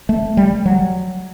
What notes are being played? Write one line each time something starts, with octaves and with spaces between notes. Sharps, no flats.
A3
G3
F#3